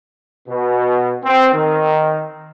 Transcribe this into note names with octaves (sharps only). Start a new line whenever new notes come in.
B2
C4
D#3